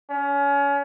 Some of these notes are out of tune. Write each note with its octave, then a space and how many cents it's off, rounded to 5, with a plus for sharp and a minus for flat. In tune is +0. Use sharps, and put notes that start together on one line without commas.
C#4 +30